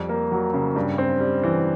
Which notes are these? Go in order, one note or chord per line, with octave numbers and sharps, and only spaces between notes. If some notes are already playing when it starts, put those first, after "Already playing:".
Already playing: F2 G3
A#3
F#3
C#3
G2
C4
G3
E3